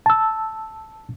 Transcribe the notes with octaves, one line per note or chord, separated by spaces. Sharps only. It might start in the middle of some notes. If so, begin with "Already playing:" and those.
A5 E6